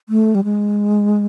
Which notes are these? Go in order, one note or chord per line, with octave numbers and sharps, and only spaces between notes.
A3
G3
G#3